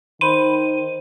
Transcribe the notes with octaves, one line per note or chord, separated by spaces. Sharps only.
D#3 C5 B5 C6 D#7